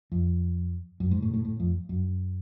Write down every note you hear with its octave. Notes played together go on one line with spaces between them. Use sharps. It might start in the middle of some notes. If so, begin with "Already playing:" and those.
F2
F#2
G#2
A2
A2
A2
F2
F#2